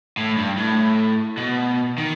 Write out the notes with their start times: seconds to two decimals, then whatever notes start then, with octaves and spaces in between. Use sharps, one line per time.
0.17 A2
0.37 G2
0.57 A2
1.37 B2
1.98 D#3